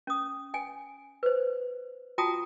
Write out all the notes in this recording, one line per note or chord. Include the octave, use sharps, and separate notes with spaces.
C#4 D#6
G5 G#5
B4 C5
F4 F#4 G5 A5 A#5 D#6